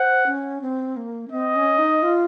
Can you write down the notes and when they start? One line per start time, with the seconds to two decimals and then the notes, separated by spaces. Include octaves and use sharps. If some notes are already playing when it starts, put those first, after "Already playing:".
Already playing: C5 F#5
0.26 C#4
0.62 C4
0.97 A#3
1.28 C#4
1.32 C4 D#5
1.56 C#4
1.78 D#4
2.02 F4